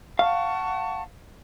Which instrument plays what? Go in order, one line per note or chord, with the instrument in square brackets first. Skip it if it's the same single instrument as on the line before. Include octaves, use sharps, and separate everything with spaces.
[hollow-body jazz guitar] F5 [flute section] F#5 A5 C#6